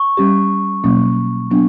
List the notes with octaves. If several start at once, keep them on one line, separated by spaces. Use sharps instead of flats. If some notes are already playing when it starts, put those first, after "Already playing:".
Already playing: C#6
G3 C#4 G4
B2 F#3 A#3 C#4
F#3 B3 D4